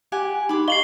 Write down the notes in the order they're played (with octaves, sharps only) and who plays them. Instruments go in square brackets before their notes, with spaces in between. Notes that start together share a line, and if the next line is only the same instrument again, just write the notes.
[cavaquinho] G4 F#5 G#5
[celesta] D#4 G4 [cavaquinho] B5 D6
[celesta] D#5 F5 C#6 [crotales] C7 F#7 G7